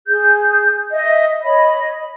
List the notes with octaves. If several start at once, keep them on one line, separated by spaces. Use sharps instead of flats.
G#4 G6
D#5 E5
C#5 D#5 B5